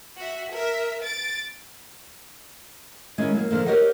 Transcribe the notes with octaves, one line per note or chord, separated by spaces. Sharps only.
F#4 E5
A#4 E5
A6 D7
D#3 G#3 C#4 E4
F#3 A#3
D3 F3 A#3
G4 A#4 C5 C#5 D#5 F#5